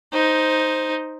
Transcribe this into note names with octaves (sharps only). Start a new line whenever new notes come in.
D#4 C5